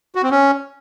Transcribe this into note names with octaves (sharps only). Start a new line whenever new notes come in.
F#4
C4
C#4